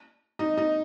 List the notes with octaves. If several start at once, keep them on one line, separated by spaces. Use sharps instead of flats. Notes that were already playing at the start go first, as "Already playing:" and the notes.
D#4
D#4